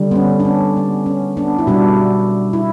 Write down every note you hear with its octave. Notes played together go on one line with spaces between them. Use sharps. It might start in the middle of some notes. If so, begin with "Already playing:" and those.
Already playing: D3 G3
B3
C#4
D4
C#4
B3
C#4
B3 D4
E4
B2 G3 D4 F#4
E4